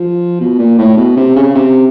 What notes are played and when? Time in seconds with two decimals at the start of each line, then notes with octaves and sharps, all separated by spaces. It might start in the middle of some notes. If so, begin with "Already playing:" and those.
Already playing: F3
0.41 B2
0.59 A#2
0.79 A2
0.97 B2
1.17 C3
1.36 C#3
1.55 C3